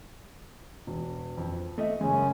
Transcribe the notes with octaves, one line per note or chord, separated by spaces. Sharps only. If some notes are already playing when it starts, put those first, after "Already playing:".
E1
F2
A3 D#5 E5
F#2 C#3 G#3 C#4